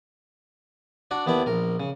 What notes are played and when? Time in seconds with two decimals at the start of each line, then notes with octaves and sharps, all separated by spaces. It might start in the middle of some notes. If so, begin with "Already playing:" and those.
1.11 D4 F#4 D5
1.26 D#2 B3 E4 D5 A5
1.46 A#1 A#4
1.80 C#3